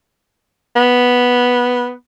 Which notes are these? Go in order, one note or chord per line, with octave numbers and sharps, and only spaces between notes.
B3